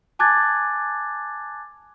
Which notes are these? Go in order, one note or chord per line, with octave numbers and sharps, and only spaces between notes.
G#5 A5 D6 F#6 G#6 A6